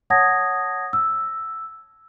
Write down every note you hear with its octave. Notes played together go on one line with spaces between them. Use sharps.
C#5 F#5 A5 D#6 G#6 A#6
E6